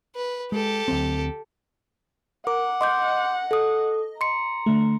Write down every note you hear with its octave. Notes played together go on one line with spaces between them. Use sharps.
B4
G#3 G4 A4
D2 F#3 C4
A#4 F#5 D6
D#5 C6 D6 G6
A4 D#6
A#5 C6 C#7
D3 A3